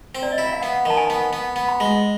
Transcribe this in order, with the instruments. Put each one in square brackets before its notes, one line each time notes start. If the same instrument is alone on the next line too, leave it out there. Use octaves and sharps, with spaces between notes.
[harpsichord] C4
[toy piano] D5
D#5
[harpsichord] E4 [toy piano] E5
[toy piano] F5
[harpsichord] B3 [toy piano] F#5
[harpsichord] D#3 [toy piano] A5
[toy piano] G#5
[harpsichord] B3
B3
B3
[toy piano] B5
[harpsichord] G#3